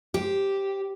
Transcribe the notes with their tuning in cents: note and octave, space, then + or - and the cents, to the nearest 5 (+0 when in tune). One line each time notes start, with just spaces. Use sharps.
G4 -5 C5 +0